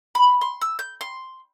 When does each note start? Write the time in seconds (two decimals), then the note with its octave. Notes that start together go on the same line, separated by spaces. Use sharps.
0.15 B5
0.41 C6
0.61 E6
0.79 G6
1.01 C6